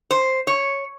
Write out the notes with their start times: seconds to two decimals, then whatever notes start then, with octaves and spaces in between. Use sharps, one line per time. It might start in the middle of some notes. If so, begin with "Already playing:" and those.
0.11 C5
0.47 C#5